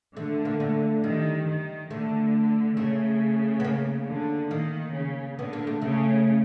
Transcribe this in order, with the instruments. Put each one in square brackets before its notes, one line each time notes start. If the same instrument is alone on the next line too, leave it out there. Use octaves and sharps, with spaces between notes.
[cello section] D3 [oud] A3
[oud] A#3
A3
[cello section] D#3 [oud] G3
[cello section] D#3
[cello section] D3 [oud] A3
[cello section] C#3 [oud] A3
[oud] B3
A#3
[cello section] D3
[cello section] D#3 [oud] A#3
[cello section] C#3
[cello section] D3 [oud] B3
[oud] A#3
A3
[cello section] C#3 [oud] A3